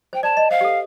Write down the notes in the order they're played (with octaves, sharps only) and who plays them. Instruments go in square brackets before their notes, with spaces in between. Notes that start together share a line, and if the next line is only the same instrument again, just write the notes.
[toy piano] C5 [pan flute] G5
[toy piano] D5 [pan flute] A5
[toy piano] D#5
[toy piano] C5 [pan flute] F5
[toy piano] G4
A4